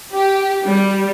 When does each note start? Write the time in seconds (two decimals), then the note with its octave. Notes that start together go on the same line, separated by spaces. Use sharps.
0.14 G4
0.66 G3